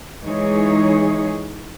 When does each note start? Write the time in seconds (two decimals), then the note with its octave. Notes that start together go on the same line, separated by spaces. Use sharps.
0.23 E3 G#3 D#4 G#4 C#5